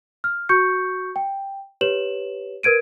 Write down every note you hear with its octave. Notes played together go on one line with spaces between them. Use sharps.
F6
F#4 C#6 G6 C#7
G5
G4 B4 C#5 E7 F#7
A#4 B4 G#6 D7 D#7